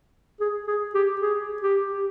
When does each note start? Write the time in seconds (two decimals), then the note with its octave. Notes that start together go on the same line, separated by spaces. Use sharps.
0.40 G#4
0.67 G#4
0.94 G4
1.21 G#4
1.62 G4
1.92 G4